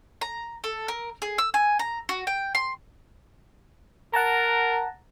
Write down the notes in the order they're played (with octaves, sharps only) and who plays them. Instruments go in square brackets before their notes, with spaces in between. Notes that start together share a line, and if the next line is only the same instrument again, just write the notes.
[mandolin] A#5
A4
A#4
G#4
E6
G#5
A#5
F#4
G5
C6
[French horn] A#4 [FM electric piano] F#5 A5 A#5